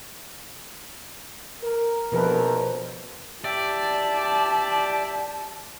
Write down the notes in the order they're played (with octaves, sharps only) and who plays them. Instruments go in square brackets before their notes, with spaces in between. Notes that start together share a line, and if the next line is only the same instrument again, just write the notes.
[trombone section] A#4
[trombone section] A#1 F2 A#4 [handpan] B2 F3 B4
[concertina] G4 E5 [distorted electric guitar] D5 [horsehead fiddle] A5